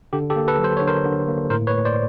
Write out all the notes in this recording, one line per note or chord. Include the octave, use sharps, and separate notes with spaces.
D3 G4
G4 A4
A#3
A4 B4
F#3
C5
D3 C#5
A#4 C5
D3
A#3
A2 A#4 C5
B4 C#5
A3
C5 D5